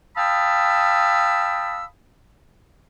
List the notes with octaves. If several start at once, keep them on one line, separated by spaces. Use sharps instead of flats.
F5 G5 A5 B5 D#6 E6